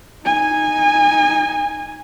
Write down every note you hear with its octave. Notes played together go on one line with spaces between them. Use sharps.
D#4 G#5